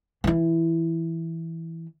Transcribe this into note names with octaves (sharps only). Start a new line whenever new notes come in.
E3 E4